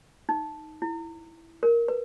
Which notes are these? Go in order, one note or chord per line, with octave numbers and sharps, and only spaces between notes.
D#4
E4
A#4
B4